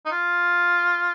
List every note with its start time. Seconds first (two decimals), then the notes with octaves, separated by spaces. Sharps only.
0.06 D#4
0.12 F4